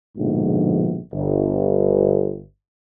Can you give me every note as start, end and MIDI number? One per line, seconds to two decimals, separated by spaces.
0.17 0.98 34
0.17 0.98 44
0.17 0.98 47
0.17 0.98 50
0.17 0.98 53
1.13 2.40 31